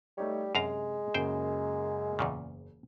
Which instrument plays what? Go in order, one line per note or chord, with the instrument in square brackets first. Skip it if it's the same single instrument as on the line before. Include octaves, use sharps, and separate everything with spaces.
[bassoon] G3 [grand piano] A3 D#4 C#5
[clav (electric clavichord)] F#2 F5 A#5 [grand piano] C3 [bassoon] G#3
[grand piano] F#2 C#3 A#3 [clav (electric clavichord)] C5 G5
[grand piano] F#1 [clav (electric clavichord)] E2 A#2 C#3